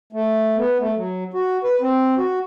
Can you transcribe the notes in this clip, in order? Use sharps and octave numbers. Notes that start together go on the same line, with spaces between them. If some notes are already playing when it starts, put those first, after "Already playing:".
A3
B3
A3
F#3
F#4
B4
C4
F#4